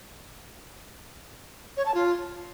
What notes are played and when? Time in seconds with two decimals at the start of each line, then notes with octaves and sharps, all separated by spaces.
1.77 C#5
1.86 A5
1.95 F4